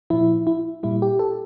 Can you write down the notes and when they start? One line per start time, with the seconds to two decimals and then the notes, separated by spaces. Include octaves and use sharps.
0.10 A#2 F3 E4
0.47 E4
0.83 A#2 G3 E4
1.02 G4
1.19 A4